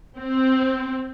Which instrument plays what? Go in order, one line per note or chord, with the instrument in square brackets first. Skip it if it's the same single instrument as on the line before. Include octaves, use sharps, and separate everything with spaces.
[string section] C4